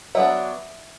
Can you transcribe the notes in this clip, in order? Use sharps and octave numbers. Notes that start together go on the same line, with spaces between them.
F#3 B3 D4 E5